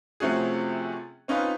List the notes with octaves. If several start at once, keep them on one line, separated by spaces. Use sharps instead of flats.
C3 F3 A3 C#4 F#4 G#4
C4 C#4 D#4 F4 B4